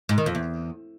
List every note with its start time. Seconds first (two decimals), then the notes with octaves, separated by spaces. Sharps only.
0.09 G#2
0.18 D#3
0.26 F2
0.35 E2